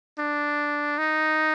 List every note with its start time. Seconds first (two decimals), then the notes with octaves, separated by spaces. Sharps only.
0.19 D4
0.98 D#4